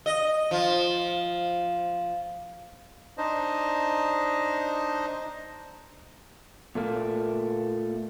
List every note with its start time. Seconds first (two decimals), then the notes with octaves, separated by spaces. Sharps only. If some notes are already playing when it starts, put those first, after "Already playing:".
0.06 D#5
0.51 F3
3.18 D4 D#4 C5 D#5
6.75 A#2 A3 A#3